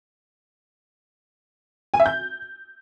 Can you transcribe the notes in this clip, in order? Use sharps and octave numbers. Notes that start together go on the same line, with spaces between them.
G#5
E5
G6